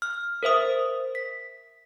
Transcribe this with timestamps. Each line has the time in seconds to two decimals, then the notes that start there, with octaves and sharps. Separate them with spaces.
0.02 F6
0.43 A#4 C5 E5 D#6
1.15 B6